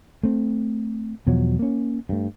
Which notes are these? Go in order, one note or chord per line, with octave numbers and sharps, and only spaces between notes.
A3 C4
E2 B2 F3 F#3
A#3 C#4
G2 A3